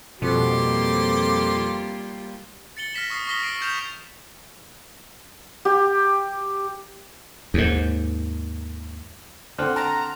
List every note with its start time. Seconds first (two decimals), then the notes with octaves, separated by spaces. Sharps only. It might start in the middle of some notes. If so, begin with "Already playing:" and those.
0.22 F2 B2 F3 G3 A#3 F4 C6 D6
2.77 A6 C#7 F#7 G7
2.94 F6 A#6 B6 E7
3.10 C#6 D#6 F6 B6 C7
3.27 C#6 D#6 A#6 B6 G7
3.42 C7 D7 F#7 G7
3.61 F6 G6 E7 F7
5.65 G4
7.54 D#2 G#2
9.58 D3 C4 F#5 C6 F6 F#6
9.76 A5 A#5